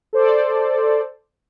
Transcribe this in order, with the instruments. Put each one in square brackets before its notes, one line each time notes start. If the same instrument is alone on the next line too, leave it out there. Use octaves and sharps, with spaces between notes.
[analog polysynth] A4 C5 D5